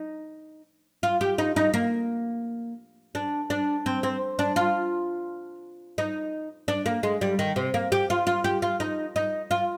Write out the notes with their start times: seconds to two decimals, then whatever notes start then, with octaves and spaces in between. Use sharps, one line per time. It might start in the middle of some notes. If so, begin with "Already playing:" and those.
Already playing: D#4
1.03 F4
1.21 G4
1.38 D#4
1.56 D#4
1.74 A#3
3.15 D4
3.50 D4
3.86 C4
4.03 C4
4.39 D4
4.56 F4
5.98 D#4
6.68 D4
6.86 A#3
7.03 G#3
7.21 G3
7.39 D#3
7.56 C3
7.74 A#3
7.92 G4
8.10 F4
8.27 F4
8.44 G4
8.62 F4
8.80 D#4
9.16 D#4
9.51 F4